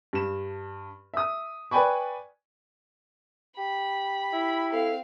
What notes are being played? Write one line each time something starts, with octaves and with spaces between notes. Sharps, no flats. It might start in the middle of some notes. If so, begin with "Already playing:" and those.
G2 E7
E5 D#6
B4 D5 G5 G#5 B5 C#6
G4 B5
E4
C4 A4 F5